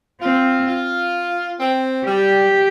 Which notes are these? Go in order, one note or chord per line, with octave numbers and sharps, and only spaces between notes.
C4 F4
F4
C4
G3 G4